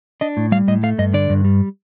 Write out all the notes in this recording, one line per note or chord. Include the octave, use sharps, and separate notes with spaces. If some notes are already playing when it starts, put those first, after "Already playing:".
D4 D#5
A2
G3 F5
A2 D#5
A3 F5
G2 D#5
D3 D5
G2
G3